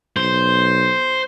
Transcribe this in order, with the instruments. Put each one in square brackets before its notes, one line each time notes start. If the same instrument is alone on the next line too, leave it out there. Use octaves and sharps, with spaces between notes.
[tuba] B1 [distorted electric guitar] C5